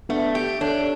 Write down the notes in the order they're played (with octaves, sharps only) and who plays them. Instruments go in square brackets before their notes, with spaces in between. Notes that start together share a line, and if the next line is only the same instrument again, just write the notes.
[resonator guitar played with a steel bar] A3 [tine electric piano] B3 D4
[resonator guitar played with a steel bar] G4
[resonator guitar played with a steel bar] D4 [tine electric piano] A4 C#5